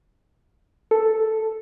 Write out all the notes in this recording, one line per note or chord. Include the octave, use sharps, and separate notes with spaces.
A4